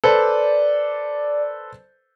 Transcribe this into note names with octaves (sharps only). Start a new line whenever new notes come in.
A4 B4 C5 D5